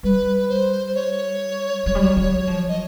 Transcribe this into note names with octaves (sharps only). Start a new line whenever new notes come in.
G3 B4
C5
C5
C#5
F#3
G3
F#3
F#3
F3
D#5